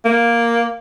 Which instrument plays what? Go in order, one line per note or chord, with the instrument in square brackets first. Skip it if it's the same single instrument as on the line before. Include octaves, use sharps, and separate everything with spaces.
[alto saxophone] A#3